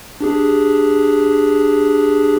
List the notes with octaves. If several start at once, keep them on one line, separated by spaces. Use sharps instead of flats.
D4 G4 G#4